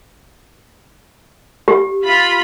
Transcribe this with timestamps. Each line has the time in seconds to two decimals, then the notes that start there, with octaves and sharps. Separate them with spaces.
1.68 G4
2.06 F4 B5